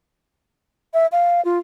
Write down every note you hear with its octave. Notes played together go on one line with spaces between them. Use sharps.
E5
F5
F4